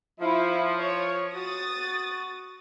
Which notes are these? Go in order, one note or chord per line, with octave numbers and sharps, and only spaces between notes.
F3 E4
C#5
F#4 D#6 A6